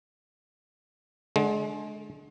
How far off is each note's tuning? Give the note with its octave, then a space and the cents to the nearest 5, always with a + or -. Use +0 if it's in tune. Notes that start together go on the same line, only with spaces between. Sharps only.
D3 +0 G#3 +30